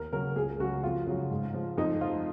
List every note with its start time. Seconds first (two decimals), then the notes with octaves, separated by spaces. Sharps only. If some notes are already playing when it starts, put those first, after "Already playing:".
Already playing: D#2 A#4
0.12 C#3 F#3 A#4
0.36 C#2 G#4
0.60 C#3 F#3 F#4
0.83 F2 F4
1.07 C#3 F#3
1.30 G#2
1.54 F3
1.78 F2 D#4
2.01 F3 F4